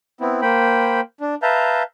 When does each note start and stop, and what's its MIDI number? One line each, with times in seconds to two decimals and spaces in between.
0.21 0.41 59
0.21 0.41 60
0.21 0.41 64
0.42 1.01 58
0.42 1.01 72
0.42 1.01 79
0.42 1.01 83
1.21 1.35 62
1.42 1.83 71
1.42 1.83 76
1.42 1.83 77
1.42 1.83 81
1.42 1.83 82
1.42 1.83 91